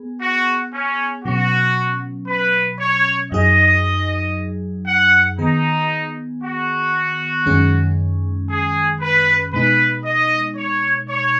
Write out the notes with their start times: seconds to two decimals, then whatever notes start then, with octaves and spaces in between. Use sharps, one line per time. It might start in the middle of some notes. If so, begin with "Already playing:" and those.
Already playing: B3 G#4
0.21 F#4
0.73 C#4
1.25 B2 F#3 C#4 F#4
2.28 B4
2.80 C#5
3.32 F#2 F#3 D#4 G#4 D#5
4.86 F#5
5.38 D#3 B3 D#4 G#4
6.43 F#4
7.46 F#2 D#3 G#3 C#4 G#4
8.50 G#4
9.01 B4
9.53 B2 G#3 D#4 B4
10.05 D#5
10.57 C#5
11.09 C#5